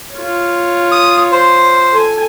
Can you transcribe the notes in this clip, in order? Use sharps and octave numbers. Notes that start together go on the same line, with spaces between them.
F4 C#5
D#6
C5
A4 G#5